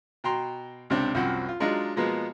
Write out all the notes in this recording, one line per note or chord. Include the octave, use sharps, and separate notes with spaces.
B2 G5 A#5 C6
C#2 C3 C4 D4
C2 F#2 F3 C4 C5 F#5
F4
F#3 G#3 D4 D#4 F4
B2 F3 G#3 A#3 B3